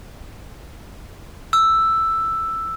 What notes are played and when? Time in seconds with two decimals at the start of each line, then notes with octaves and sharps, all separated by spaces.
1.53 E6